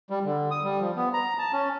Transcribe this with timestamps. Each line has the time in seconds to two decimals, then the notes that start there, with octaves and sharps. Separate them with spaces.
0.10 G3
0.25 D3
0.51 D#6
0.64 G3
0.81 F3
0.96 B3
1.14 A#5
1.38 A5
1.53 C#4